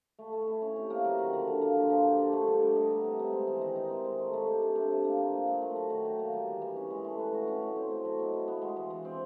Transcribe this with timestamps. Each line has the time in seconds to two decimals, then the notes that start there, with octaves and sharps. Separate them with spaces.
0.19 A3
0.33 A3
0.47 E4
0.62 C#4
0.76 C3
0.90 A#3
1.05 F#3
1.18 D#3
1.33 D3
1.47 D3
1.61 A#3
1.76 F3
1.90 F3
2.04 G4
2.19 D4
2.33 A3
2.47 G3
2.62 G3
2.76 D#4
2.90 B3
3.04 C3
3.19 C3
3.33 G#3
3.47 E3
3.61 D#3
3.76 D#4
3.90 C4
4.05 G#3
4.19 A3
4.33 A3
4.47 G4
4.62 D4
4.76 C3
4.91 C3
5.05 A#3
5.19 F3
5.33 A#2
5.47 A#2
5.62 A3
5.76 F#3
5.90 D#3
6.05 D#3
6.19 A#3
6.33 G3
6.47 E3
6.62 E3
6.76 C#4
6.90 G#3
7.04 A3
7.19 B4
7.34 F#4
7.48 C#4
7.62 A2
7.76 C4
7.90 A3
8.05 F#3
8.19 B2
8.33 E4
8.48 B3
8.62 G#3
8.76 E3
8.90 E3
9.05 C4